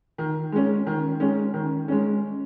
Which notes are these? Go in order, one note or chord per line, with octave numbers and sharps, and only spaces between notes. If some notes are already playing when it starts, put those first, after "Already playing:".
D#3
G#3 C#4
D#3
G#3 C#4
D#3
G#3 C#4